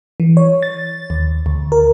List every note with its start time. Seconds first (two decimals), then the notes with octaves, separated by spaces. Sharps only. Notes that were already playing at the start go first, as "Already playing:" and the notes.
0.20 E3
0.37 C#5
0.63 A6
1.10 D#2
1.46 D2
1.72 A#4